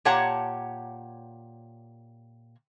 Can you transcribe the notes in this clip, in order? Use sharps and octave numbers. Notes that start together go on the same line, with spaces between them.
A#2 G4 C#5 F#5 A5 A#5